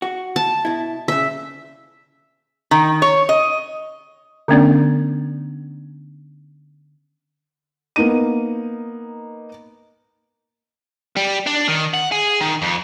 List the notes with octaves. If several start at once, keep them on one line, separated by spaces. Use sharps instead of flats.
F#4
A5
B2 E4
A#2 C#3 E5
D#3
C#5
D#5
D3 A3 B3 C#4 D4 D5
A#3 B3 D#4 D#7
G3
D4
D#3
F#5
G#4
D#3
F2